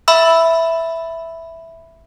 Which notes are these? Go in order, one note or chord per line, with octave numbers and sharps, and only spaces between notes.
E5 B5 E6